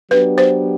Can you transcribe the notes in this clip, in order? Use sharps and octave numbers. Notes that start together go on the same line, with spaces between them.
F#3 B3 D4 G4 B4
C5